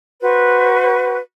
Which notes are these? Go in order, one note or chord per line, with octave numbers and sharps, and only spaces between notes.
F#4 B4 C5